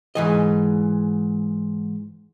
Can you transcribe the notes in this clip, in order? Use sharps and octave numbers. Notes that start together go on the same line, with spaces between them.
G#2 E3 D#5